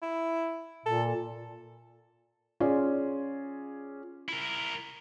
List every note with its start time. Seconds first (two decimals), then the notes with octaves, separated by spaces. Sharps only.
0.02 E4
0.86 A#2 A4
2.60 C#4 F4 G#4 D5
4.29 E4 A#4